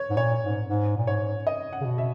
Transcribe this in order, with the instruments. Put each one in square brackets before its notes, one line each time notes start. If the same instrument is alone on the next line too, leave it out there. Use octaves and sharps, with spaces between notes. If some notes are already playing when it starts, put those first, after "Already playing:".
Already playing: [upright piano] C#5
[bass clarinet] G#2
[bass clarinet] A#2 [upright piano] C#5
[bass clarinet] G#2
G#2
A#2
[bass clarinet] G#2 [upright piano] C#5
[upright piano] D#5
F#5
[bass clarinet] C#3
B2
[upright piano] E5